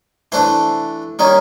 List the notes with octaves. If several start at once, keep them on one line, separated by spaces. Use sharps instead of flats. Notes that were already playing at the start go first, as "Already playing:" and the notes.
E3 A3 D4 C5
D#3 G3 A#3 C#4